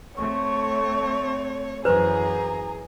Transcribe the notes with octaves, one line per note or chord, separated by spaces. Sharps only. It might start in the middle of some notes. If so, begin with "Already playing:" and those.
A3 C4 C#5 C#6
F#2 E3 G#4 B4 C5 A#5